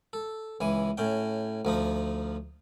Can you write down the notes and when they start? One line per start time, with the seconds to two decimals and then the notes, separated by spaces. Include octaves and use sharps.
0.13 A4
0.61 C#2 E3 G#5
0.98 A2 C#4 G5
1.65 D2 F3 D#4